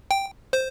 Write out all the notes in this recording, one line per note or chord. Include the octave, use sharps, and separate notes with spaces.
G5
C5